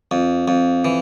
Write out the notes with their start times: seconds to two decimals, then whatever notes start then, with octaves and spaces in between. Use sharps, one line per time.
0.11 F2
0.48 F2
0.85 E3